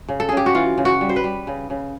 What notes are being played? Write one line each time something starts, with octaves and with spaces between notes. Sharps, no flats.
C#3
A4
C#3 G#4
G4
F#4
E3 F4
C#3
F#4
G3
C5
B4
G3
C#3
C#3